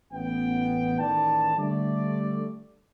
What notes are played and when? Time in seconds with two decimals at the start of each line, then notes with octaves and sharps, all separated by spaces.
0.12 A1 B3 G5
0.99 A1 D#3 D#4 D5 A5
1.57 D3 G3 A3 D5